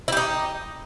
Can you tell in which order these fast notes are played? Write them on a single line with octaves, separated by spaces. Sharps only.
E4 G4 D#4